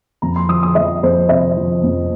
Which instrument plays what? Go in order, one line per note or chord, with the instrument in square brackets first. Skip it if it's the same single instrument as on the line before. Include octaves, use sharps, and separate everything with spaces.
[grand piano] F2 A#5
C6
F3 D#6
D#6
F3 D#5
F2 C5
C3 D#5
F3
F2